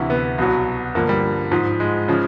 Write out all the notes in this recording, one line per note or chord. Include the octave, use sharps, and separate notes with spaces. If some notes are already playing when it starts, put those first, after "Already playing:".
Already playing: D2 C3 E3 E4
B3
C2 B2 F#3
G2 D3 F3 A#3
G3
G#2 F3
G#3
C#3 F3